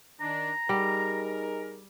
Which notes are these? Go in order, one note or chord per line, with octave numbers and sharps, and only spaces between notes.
D#3 D4 A#5
G3 D#4 G#4 A#4